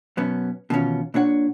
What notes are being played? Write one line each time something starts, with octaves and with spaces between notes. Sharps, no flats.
F#2 B2 B3 C#4
B2 D#3 E3 C#4 F4
A#2 D4 C#5 F#5